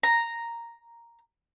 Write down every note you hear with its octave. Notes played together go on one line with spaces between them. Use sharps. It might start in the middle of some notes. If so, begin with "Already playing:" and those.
A#5